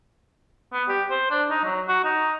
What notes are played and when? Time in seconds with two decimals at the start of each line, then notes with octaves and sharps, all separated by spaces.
0.73 B3
0.89 G4
1.11 C5
1.31 D4
1.50 D#4
1.64 F#3
1.88 F#4
2.05 D#4